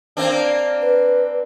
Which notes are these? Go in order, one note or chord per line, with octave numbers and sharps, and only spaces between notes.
A#3 C4 D4
B4